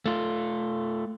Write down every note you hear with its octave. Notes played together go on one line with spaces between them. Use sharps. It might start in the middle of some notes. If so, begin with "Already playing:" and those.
A3 F4